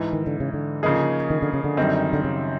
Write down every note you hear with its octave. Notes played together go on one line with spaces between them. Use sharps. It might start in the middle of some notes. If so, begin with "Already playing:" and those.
Already playing: G#2 E3 G#3
D#3
D3
C#3
D3
C#3 F3 A#3 D#4 G#4
D#3
D3
C#3
D3
F#2 D#3 G3 C4 D#4
D3
C#3